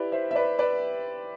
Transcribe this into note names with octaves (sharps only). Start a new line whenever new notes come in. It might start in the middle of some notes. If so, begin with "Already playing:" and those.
Already playing: E4 G4 B4 D5
C5 E5
E5
B4 D5
B4 D5